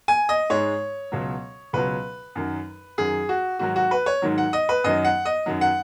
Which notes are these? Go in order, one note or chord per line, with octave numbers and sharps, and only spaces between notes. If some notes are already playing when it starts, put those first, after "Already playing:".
G#5
D#5
G#2 G#3 C#5
C#2 B2 F#3
C#2 B2 F#3 B4
F#2 D#3 F#3
F#2 D#3 F#3 G#4
F#4
G#2 D#3 F#3 F#4
F#4
B4
C#5
G#2 D#3 F#3
F#5
D#5
B4
F#2 D#3 F#3 D#5
F#5
D#5
F#2 D#3 F#3
F#5